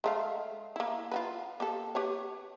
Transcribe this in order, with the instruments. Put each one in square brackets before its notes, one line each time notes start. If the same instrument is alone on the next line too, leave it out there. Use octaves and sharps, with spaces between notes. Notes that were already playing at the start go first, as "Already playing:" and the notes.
[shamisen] G#3 A3 F5
A#3 E4
F4 F#4 B4
A#3 G4 A4
G4 B4 C#5